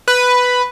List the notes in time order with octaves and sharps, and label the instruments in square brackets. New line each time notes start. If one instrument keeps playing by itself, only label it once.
[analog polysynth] B4